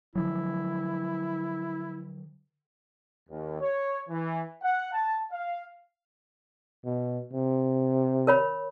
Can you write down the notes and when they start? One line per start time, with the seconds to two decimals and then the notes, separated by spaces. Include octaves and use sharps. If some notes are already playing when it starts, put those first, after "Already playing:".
0.15 D3 F3 F#3 E4
3.29 D#2
3.61 C#5
4.09 E3
4.62 F#5
4.92 A5
5.31 F5
6.85 B2
7.33 C3
8.27 A#4 C#5 B5